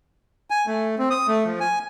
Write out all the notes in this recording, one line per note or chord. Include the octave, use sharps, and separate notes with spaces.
G#5
A3
C4
D#6
A3
F3
G#5